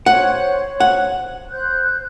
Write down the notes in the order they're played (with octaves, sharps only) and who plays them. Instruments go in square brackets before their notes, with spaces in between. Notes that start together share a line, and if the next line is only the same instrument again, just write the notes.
[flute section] C5 C#5 [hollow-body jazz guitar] F#5
[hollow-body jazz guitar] F#5
[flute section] C5 F#6 G6